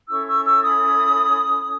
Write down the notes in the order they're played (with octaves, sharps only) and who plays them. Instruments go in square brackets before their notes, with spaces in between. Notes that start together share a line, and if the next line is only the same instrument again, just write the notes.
[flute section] C#4 E4 A4 C#5 C#6 E6
C#6 E6
C#6 E6
B5 D#6